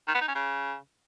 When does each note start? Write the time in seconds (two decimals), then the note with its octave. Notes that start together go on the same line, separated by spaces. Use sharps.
0.08 D#3
0.14 B3
0.21 D#4
0.28 C#4
0.35 C#3